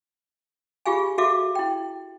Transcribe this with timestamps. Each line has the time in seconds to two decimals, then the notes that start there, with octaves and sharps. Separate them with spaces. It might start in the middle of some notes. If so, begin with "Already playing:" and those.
0.86 F4 G4 G#4 F5 G#5
1.18 F#4 G#4 A4 E5 F5 D6
1.55 E4 G5